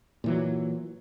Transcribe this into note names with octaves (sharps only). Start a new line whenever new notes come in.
A#2 E3 F#3